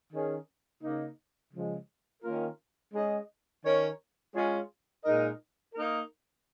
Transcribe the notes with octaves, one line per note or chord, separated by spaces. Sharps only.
D#3 C#4 G#4
C#3 A#3 D#4
C#3 F3 G#3
D#3 A#3 C#4 F4 A#4
G#3 C#4 G#4 D#5
D#3 C#4 A#4 C#5
G#3 C#4 F4 G#4 C#5
A#2 G#3 D#4 A#4 D#5
A#3 D#4 A#4